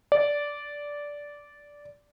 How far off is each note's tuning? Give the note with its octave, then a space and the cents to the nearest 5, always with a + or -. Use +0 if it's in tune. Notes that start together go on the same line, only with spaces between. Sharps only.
D5 -10